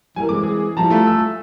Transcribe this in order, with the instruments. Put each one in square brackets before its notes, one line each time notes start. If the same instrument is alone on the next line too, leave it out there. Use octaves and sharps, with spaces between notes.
[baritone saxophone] E3 [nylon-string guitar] G3 E4 A#4 [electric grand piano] G#5
[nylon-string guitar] G#3 C4 [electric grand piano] D6
[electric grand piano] G#4
[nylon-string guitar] F3 G3 E4 [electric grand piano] A5 A#5
[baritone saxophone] A3 [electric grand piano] F4
[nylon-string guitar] G#5 [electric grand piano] E6